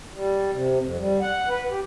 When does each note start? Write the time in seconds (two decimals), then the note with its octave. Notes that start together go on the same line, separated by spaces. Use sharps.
0.14 G3
0.53 C3
0.81 F2
0.99 G3
1.21 F#5
1.49 B4
1.70 G4